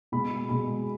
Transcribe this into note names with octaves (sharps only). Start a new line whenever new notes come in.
B2 G#3 B5
B2 G#3 B5